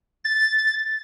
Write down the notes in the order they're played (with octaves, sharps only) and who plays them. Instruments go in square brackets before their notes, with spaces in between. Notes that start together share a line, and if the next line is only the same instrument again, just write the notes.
[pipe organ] A6